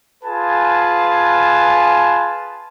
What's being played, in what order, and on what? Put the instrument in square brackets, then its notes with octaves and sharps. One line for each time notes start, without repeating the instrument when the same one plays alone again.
[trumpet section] F4 G#4 B4 G#5 A5